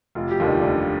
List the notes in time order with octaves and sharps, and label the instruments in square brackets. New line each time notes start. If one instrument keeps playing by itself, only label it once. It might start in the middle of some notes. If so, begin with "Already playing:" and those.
[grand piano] F1 [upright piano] F4
[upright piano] G4
[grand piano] D#2 D3 G3 [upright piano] F4
[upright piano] D#4
[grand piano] F1 [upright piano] D4